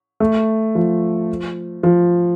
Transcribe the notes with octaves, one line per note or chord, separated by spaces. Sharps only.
A3
F3
F3